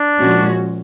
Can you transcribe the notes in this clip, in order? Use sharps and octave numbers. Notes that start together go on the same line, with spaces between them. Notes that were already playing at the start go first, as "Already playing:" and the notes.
Already playing: D4
A#2 F3 G#3 C#4 F#4